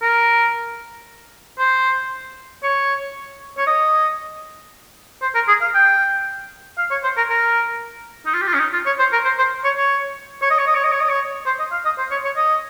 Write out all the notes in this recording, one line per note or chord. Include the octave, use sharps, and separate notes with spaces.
A#4
C5
C#5
C#5
D#5
C5
A#4
G#4
F5
G5
F5
C#5
C5
A#4
A#4
D#4
F4
G4
F4
C#4
D#4
F4
C#5
C5
A#4
C5
C5
C#5
C#5
C#5
D#5
C#5
D#5
C#5
D#5
C#5
D#5
C#5
C5
D#5
F5
D#5
C5
C#5
C#5
D#5